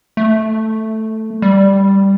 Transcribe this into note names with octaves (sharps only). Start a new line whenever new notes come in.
A3
G3